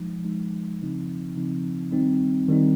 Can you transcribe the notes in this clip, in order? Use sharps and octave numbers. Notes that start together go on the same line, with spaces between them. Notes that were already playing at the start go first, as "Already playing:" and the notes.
Already playing: F3 G#3 D#4
F3 G#3 D#4
C#3 F3 C4 D#4
C#3 F3 C4 D#4
D#3 G3 C4 D#4
D#3 G3 C4 D#4